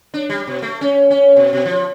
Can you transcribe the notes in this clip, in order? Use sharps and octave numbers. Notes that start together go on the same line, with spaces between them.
D4
G3
B2
A3
C#4
C#4
B2
B2
F3